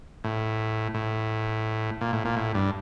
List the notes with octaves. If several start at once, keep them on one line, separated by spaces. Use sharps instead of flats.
A2
A2
A#2
A2
A#2
A2
G2